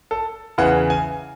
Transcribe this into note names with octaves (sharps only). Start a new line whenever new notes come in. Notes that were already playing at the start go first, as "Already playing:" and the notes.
A4
E2 C#3 E3 F#5
G#5